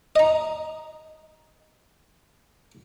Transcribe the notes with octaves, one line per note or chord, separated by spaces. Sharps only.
D#5 A#5